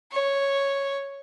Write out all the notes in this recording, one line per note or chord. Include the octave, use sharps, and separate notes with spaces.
C#5